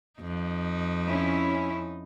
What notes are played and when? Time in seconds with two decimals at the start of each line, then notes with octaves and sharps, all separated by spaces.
0.20 F2 D#4
1.07 C#4 E4